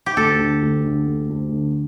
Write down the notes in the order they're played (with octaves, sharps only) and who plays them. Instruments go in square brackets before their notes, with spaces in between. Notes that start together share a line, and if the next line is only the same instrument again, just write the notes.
[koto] G4
[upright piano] D2 [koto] A4
[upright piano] D3
D2
D3
D2
D2
D3